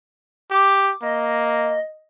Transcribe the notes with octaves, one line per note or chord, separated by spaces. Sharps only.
G4 D6
A#3 D#5